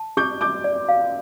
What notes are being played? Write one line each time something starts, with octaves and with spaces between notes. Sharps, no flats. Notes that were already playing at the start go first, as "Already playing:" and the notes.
Already playing: A5
G4 D6 G6
G4 D6 G6
D5
F5